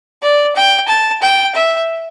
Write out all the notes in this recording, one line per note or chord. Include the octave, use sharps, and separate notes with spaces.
D5
G5
A5
G5
E5